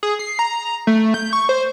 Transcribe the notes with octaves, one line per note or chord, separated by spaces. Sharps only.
G#4
C7
A#5
A3
G6
C#6
C5